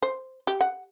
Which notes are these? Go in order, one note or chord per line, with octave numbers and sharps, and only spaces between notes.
C5
G4
F#5